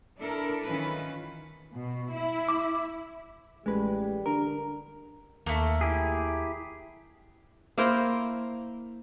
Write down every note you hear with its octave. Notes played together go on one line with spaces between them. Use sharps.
D4 E4 A4 A#4
D#3 E3 C#4 F4 B4
B2
E4
D6
A1 G3 G#3 B4
D3 A#4
D#2 A3 A#3
E4 G4 G#4
A#3 E4 A#4 C5